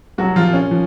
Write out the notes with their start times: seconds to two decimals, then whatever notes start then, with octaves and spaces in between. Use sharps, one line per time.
0.18 C2 F#3 F#4
0.36 F3 F4
0.45 A#2
0.53 C#4
0.71 F3